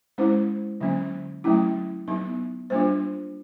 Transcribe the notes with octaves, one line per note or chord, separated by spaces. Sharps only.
G#3 C#4 E4 C5
D3 F#3 A#3 C#4
F#3 A3 C#4 E4
F#3 B3 D#4
G3 A#3 D4 F4 C5